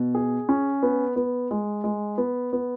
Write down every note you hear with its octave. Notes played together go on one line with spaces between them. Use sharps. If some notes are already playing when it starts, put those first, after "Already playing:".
Already playing: B2
G#4
C#4
B3
B3
G#3
G#3
B3
B3